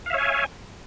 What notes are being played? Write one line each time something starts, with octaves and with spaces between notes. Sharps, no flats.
C#5 E5 F5 G#5